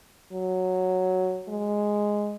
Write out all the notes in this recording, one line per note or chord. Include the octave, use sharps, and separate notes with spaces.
F#3
G#3